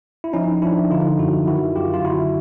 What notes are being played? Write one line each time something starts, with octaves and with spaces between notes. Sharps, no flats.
E4
F3 C#4 D#4
F3 D4 E4
D3 D#4 F4
F#2 E4 F#4
D#3 E4 F#4
F#2 F4 G4
F4
D3 E4 F#4